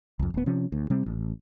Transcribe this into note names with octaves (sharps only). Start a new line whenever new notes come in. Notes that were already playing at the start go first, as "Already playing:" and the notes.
C2 F2
D1 B3
C3 F3 C#4
D2
C3 G3 C4
A1